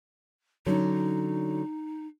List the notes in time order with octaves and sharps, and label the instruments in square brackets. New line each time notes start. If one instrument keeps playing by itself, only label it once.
[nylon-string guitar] D3 F#3 C#4 [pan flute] D#4